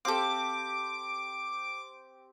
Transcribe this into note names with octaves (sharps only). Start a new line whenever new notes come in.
C4 G4 A4 F5 D6